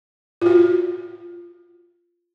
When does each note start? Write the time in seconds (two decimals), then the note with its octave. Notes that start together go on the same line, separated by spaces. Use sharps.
0.42 F4
0.46 F#4